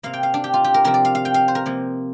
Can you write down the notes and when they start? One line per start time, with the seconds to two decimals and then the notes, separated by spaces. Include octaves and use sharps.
0.03 C3 A#3 F5
0.13 G5
0.23 F5
0.34 D4
0.44 G4
0.54 F4
0.64 G4
0.74 A#4
0.84 C3 F3 C4 A#4
0.94 D5
1.05 F5
1.15 F5
1.25 G5
1.34 F5
1.48 C5
1.55 A#4
1.66 C3 F3 A#3